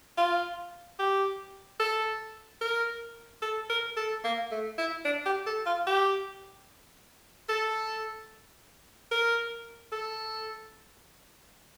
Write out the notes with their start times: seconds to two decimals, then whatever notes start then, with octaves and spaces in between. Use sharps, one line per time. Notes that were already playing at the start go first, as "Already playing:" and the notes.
0.17 F4
0.99 G4
1.80 A4
2.61 A#4
3.42 A4
3.70 A#4
3.97 A4
4.24 A#3
4.51 A3
4.78 E4
5.05 D4
5.26 G4
5.46 A4
5.66 F4
5.87 G4
7.49 A4
9.11 A#4
9.92 A4